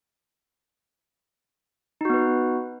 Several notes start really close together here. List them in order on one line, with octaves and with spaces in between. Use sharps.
D#4 F#4 B3 B4